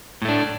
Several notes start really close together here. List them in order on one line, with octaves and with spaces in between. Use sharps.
A2 A3 D4